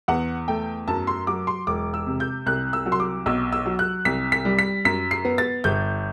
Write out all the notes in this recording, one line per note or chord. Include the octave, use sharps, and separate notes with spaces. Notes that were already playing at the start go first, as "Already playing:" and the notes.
E2 F#5
A3 G5
F#2 A5
C6
F#3 D6
C6
E1 D6
E6
C3
G6
C2 F#6
E6
F#3
C6
D6
B1 E6
E6
F#3
F#6
C2 B6
B6
G3
B6
F#2 B6
C7
B3
A6
G1 G6